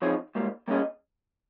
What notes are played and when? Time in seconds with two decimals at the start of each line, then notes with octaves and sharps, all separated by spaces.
0.02 F3 C4 D#4 G#4 C#5
0.35 G#2 G3 A#3
0.68 G3 A#3 C#4 G#4 D#5